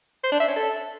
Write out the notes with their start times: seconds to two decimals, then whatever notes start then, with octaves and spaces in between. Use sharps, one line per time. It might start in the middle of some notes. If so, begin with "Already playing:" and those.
0.24 C5
0.32 D4
0.40 E5
0.48 C#4
0.56 A4